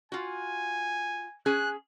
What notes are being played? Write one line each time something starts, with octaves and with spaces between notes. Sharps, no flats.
F4 F#4 G#5
C#4 G#4 F#6